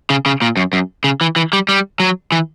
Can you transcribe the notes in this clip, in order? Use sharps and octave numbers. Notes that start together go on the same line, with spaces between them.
C#3
C#3
A#2
F#2
F#2
C#3
E3
E3
G3
G3
F#3
E3